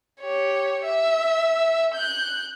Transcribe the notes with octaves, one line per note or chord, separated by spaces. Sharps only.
G4 C#5
E5
F#6 G6